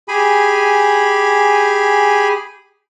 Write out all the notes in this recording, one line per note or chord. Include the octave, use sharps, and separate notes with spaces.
G4 G#4 G#5 B5